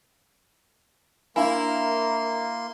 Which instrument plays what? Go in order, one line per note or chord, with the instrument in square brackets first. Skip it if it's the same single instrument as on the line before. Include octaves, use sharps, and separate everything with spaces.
[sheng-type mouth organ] A#3 C6 [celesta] D4 F5 G#5 [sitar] E4 [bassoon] A#4